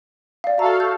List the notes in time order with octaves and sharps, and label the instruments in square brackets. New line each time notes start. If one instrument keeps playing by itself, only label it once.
[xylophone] D5 F5
[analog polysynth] F#4 A4 F5 [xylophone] E5 A#5
[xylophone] G6